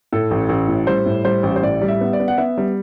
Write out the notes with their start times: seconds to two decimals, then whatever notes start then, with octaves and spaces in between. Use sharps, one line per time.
0.13 A2 A4
0.31 A1
0.49 A1
0.68 A2
0.87 G3 C5
1.06 A2
1.24 G3 C5
1.43 A1
1.56 C5
1.63 A2 D5
1.81 G3
1.88 E5
2.01 B3
2.13 D5
2.20 B3
2.28 F#5
2.37 B3 E5
2.58 G3